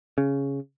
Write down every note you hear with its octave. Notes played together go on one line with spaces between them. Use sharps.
C#3